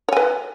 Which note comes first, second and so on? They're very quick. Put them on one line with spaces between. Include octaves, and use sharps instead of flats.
C#5 G#5 B4